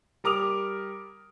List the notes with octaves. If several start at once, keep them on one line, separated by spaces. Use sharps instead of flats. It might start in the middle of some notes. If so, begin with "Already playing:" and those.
G3 A#4 D6 D#6 F7